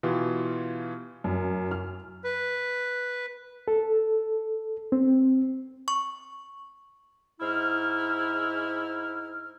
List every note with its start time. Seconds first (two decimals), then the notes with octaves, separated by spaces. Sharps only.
0.03 B2 E3 F4 G4
1.24 F#2
1.71 F6
2.24 B4
3.68 A4
4.92 C4
5.88 C#6
7.41 G#2 E4 F6